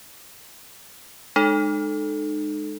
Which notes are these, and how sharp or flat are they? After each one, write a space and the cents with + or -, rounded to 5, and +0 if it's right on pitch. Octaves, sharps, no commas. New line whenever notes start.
G#3 +0 D#4 -35 A4 -10